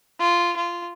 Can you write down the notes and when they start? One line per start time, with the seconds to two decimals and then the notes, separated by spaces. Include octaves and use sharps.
0.20 F4
0.56 F4